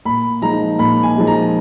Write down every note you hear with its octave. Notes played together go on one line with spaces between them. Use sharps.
A#2 B5
F3 G#3 D#4 A#5
A#2 B5
G#5
F3 G#3 D#4
A#5